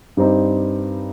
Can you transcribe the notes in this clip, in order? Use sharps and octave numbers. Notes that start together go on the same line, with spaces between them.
G2 G3 C4 D#4